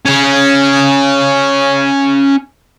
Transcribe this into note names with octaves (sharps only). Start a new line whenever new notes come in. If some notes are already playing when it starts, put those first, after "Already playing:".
C#4 G#4